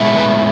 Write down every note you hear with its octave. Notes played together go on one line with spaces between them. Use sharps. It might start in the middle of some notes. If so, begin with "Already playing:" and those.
Already playing: A2 G#3 B3 E4
B4